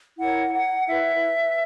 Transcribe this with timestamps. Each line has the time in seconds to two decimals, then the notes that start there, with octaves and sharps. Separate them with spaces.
0.19 E4 A#4 C#5 F#5
0.54 F#5
0.87 E4 B4 E5